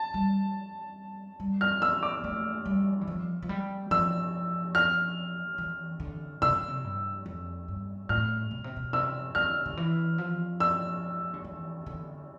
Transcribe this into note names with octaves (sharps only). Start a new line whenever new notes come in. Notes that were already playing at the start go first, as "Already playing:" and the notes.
Already playing: A5
G3
G3
F6
B3 E6
D6
A3
G3
E3
F3
F3
G3
F3 E6
F6
E3
D3
C3 E6
D3
C3
G2
F2
G2
A2 F6
B2
C3
B2
C3 E6
D3 F6
D3
E3
F3
E6
D3
E3
D3